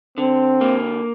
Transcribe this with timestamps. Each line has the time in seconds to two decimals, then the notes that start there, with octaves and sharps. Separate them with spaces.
0.18 D3 C4
0.61 A#3